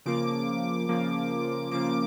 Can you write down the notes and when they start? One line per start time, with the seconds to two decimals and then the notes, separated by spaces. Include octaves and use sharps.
0.06 C#3 F3 A#3 D6
0.89 C#3 F3 A#3
1.71 C#3 F3 A#3 D6